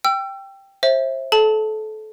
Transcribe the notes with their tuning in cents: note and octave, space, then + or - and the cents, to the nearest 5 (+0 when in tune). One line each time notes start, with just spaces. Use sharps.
G5 +0 E6 +35
C5 +35 E5 +0
A4 -30 A5 +0